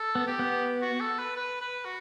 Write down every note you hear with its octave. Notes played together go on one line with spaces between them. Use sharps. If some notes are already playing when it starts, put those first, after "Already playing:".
Already playing: A4
B3
G4
B3
F#4
A4
B4
B4
B4
F#4